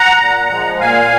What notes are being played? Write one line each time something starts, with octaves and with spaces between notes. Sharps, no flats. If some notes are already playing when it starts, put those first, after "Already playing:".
Already playing: F#5 A#5
A#2
F3 G#3
A#2 F5 G#5